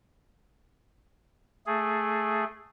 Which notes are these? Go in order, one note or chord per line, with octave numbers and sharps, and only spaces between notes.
A3 G#4